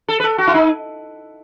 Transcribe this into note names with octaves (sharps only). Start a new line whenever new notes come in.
A4
B4
A4
F#4
E4
D#4